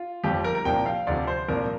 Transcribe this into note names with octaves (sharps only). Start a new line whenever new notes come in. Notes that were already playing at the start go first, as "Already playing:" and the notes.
Already playing: F4
G1 F2 F3 G4
A#4
A#4
C2 A#2 F3 G5
F5
D2 C3 F3 D5
C5
C2 A#2 F3 A#4